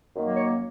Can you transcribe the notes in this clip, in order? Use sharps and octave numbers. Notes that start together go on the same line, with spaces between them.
F#2 D#3 F#3 A#3
C#5